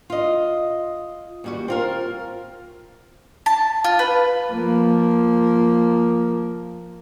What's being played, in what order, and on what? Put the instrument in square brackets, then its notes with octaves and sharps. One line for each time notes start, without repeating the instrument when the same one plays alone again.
[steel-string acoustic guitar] F4 D#5
D#2 G3 F#4
C4 F4 A#4
[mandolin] A5
F4
B4
[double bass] F3 A#3